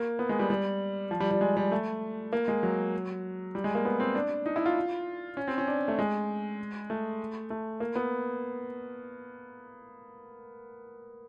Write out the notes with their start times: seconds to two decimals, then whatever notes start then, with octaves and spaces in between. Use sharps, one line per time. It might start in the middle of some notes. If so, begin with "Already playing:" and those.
Already playing: A#3
0.19 B3
0.29 G#3
0.39 G3
0.50 G3
1.11 F3
1.20 G3
1.31 G3
1.41 G#3
1.57 G3
1.72 A3
2.33 A#3
2.48 G#3
2.63 F#3
3.55 G3
3.64 G#3
3.75 A#3
3.85 B3
4.00 C4
4.15 D4
4.46 D#4
4.56 E4
4.66 F4
5.37 C#4
5.48 C4
5.58 C#4
5.67 D4
5.88 A3
5.99 G#3
6.90 A3
7.50 A3
7.80 A#3
7.95 B3